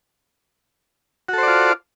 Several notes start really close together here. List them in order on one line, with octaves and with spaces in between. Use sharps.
F#4 A4 C5 D5 F4